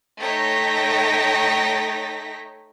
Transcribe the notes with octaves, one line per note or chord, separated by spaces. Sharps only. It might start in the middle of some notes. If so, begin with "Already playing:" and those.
A3 D#4 C#5 G5 A#6 B6